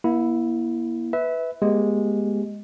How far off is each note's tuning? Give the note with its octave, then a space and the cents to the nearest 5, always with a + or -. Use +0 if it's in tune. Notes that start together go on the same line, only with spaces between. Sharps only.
A#3 +45 E4 +0
B4 +10 E5 -20
G#3 +0 B3 -45 G4 +0